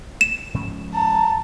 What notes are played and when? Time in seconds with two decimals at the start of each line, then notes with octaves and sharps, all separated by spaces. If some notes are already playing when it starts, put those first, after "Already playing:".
0.21 E7
0.54 G#2 F3 C#4
0.94 A5 A#5